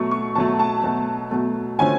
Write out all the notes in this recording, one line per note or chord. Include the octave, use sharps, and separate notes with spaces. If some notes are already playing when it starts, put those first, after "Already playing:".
Already playing: B2 F#3 A3 C#6
C#6
B2 F#3 A3 A5
A5
B2 F#3 A3
B2 F#3 A3
D3 F3 A3 C#4 G#5